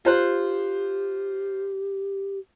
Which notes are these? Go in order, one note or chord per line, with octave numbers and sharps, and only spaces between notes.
F4 G4 C5 F#6